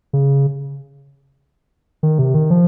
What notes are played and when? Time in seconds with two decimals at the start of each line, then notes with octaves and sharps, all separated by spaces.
0.13 C#3
2.03 D#3
2.18 C3
2.34 D#3
2.50 F3